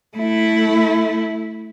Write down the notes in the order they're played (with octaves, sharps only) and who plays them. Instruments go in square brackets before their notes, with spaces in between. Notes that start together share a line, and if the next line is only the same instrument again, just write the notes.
[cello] A3 E4